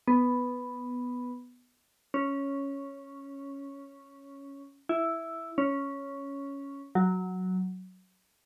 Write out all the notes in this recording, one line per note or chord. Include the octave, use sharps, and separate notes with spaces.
B3
C#4
E4
C#4
F#3